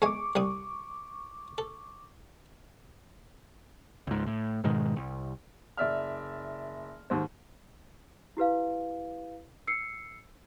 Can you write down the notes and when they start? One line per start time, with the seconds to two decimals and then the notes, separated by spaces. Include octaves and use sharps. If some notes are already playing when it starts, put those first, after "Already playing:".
0.02 E2 G#3 G#5 C#6 D6
0.35 C2 G3 D#6
1.58 A4
4.07 C#2 G#2
4.26 A2
4.64 G#2 B2 D#3 G#3
4.96 C2
5.77 F#1 D5 E5 F6
7.10 D#2 G#2 C5
8.37 E4 G4 B4 F5
9.67 E6 C7 C#7